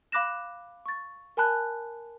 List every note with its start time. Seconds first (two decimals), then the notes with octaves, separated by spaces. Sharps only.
0.12 F5 B5 D6 F#6 A#6 E7
0.86 C#6 A6
1.37 A#4 G#5 A5 B5 F#6